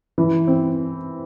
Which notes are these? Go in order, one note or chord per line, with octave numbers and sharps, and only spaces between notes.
E3
C4